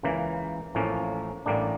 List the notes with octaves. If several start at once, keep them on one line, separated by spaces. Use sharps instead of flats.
C#2 C#3 E3 A#3
A1 A2 F3 A#3 C#4
A1 A2 G3 A#3 D4